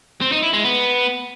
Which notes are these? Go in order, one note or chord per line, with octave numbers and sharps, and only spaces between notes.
C4
D#4
E4
G#3
B3